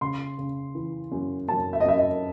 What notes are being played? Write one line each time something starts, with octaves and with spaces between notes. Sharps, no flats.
C#3 C6
C#3
E3
F#2
F#2 A5
E5
D#5
F#2 E5
D#5